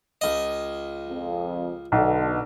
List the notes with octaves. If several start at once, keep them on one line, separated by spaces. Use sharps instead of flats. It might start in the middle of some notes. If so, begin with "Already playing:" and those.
C#2 D#5
F2
B1 B2 D3